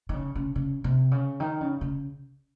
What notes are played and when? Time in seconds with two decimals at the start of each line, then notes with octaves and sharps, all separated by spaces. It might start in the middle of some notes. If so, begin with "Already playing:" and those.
0.09 D#3
0.14 C#3
0.36 C#3
0.55 C#3
0.84 C3
1.11 C#3
1.40 D#3
1.61 C#3
1.81 C#3